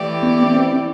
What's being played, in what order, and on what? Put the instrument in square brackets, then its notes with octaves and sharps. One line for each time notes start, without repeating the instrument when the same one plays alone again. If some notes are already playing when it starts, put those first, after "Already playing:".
Already playing: [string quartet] E3 A3 E4 G4 D5
[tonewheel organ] B3
C4